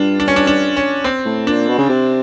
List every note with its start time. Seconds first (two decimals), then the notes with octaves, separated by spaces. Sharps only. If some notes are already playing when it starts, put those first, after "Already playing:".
Already playing: G2 D4 F4
0.20 D4
0.28 C#4
0.36 D4
0.47 D4
0.76 C#4
1.04 C4
1.25 A2
1.47 A#2 D4
1.69 B2
1.78 C#3
1.89 C3